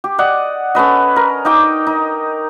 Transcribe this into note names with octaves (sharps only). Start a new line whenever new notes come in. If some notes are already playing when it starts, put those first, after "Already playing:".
G4
D5 D#5 F#5
C#4 A4 B4 D#5
A#4
D#4 D#5 G5 D6
D#4